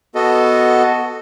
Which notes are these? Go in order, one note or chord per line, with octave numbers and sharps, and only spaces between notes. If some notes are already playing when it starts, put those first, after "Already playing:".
B3 F#4 A4 D#5